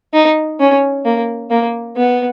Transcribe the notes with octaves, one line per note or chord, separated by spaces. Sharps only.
D#4
C#4
A#3
A#3
B3